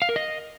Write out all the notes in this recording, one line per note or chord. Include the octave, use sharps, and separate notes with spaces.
F5
A#4
D#5